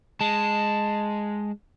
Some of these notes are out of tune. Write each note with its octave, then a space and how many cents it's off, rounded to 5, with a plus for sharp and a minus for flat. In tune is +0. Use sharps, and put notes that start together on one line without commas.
G#3 +0 A5 +0